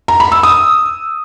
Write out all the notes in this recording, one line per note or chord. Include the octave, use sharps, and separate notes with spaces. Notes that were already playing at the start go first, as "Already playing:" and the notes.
A#5
B5
E6
D#6